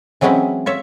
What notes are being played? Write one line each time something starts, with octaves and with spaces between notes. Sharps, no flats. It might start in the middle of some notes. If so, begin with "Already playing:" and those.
E3 F#3 G#3 C4 C#4 E4
F4 C#5 E5